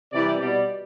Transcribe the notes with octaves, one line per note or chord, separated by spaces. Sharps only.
C3 E3 G3 D5
B2 G3 D5